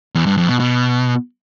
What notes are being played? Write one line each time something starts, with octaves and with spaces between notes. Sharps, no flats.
E2
G2
F2
B2
B2